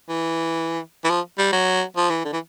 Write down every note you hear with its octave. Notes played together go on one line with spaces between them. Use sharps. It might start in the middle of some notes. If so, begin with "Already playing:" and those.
E3
E3
F3
G3
F#3
F3
E3
D3
E3